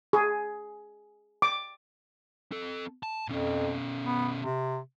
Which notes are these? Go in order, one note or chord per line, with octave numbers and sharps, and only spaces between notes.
G#4
D6
C4 A4
A5
F2 B2 C#4
B3
C3